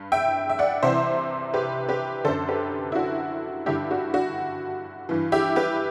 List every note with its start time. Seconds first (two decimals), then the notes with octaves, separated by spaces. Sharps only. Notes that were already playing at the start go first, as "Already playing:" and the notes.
Already playing: G2
0.12 E5 G5
0.49 E5
0.59 D5 F#5
0.83 C2 C3 E3 C5 E5
1.54 G4 B4
1.89 G4 B4
2.24 D3 A4 C5
2.28 F#2
2.48 G4 B4
2.92 E4
2.95 F#4
3.66 G2 D3 E4 G4
3.91 F#4
4.14 F#4
5.09 G2 E3
5.32 E4 G4
5.56 G4 B4